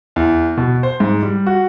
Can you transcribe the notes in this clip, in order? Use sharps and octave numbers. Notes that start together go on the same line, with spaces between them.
E2
B2
C5
G#2
G3
F#4